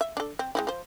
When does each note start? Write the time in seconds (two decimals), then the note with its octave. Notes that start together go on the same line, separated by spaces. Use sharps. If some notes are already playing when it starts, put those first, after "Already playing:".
0.01 E5
0.17 D4 A4
0.39 C4
0.55 G#3 C4 E4
0.67 F3 C5